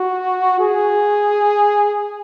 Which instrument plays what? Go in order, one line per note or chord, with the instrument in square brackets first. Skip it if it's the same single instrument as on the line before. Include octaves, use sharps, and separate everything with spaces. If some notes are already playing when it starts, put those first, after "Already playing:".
Already playing: [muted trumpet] F#4
G#4